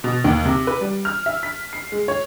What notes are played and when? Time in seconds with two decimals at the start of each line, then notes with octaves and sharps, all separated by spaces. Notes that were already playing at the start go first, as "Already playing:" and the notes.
0.04 B2
0.24 D#2
0.45 C3
0.67 B4
0.81 G3
1.05 F6
1.26 E5
1.43 B6
1.73 C7
1.92 G#3
2.08 C#5